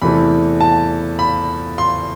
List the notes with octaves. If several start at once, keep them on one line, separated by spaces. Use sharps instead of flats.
E2 C3 E3 A3 B5
A5
B5
C6